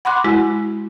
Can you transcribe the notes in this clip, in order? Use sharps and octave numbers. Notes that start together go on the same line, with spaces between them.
F#5 B5 C6 D6 F#6
G#3 E4 F#4